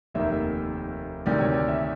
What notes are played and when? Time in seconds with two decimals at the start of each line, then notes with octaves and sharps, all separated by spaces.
0.14 F1 D#2 D#3 E5
1.26 D2 C3 D#3 D5
1.41 C#5
1.54 D5
1.68 E5